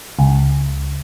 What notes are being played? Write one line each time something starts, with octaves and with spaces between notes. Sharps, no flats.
C#2